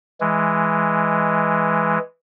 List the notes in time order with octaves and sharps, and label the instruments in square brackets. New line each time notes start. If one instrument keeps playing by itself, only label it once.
[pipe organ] E3 G#3